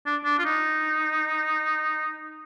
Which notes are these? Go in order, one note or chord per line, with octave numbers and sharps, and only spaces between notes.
D4
D4
F4
D#4